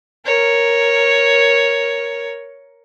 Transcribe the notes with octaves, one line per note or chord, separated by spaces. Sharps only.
A#4 C#5